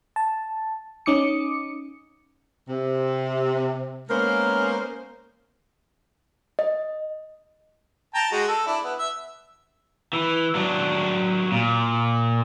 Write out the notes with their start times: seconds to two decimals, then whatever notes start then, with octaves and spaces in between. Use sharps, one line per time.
0.16 A5
1.06 C#4 D#4 D6 D#6 C#7
2.68 C3
4.10 G#3 A#3 B3 C#4 A#4 C5
6.59 D#5
8.15 G5 A5 A#5
8.32 G#3 F#4
8.48 A4
8.67 D4 E4
8.84 B3
8.98 E5
10.13 E3
10.55 F#3 D4
11.52 A#2